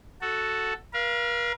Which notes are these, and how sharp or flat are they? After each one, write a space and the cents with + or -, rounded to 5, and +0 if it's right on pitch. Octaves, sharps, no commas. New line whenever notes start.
F#4 +0 A4 +0
A#4 +45 F5 -20